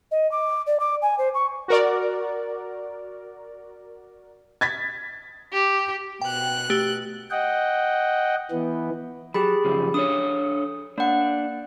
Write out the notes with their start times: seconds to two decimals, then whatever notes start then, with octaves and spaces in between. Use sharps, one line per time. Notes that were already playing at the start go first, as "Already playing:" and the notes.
0.11 D#5
0.31 D6
0.67 D5
0.80 D6
1.02 G#5
1.18 C5
1.34 C#6
1.68 F#4 A#4 D5
4.61 G#6 A6 B6
5.52 G4
6.21 B2 G5 F#6
6.70 A3 G4
7.31 D#5 F#5 G5
8.51 E3 B3
9.34 F#3 G4 G#4 B5
9.64 F#2 C#3 F3
9.94 D4 A4 C#5 D#6
10.98 A#3 D4 F#5